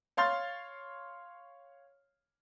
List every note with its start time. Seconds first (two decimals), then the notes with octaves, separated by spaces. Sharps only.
0.17 C#5 F5 C6 A6